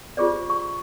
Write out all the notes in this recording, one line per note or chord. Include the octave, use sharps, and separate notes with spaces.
F4 G4 G#4 C5 D5
C#6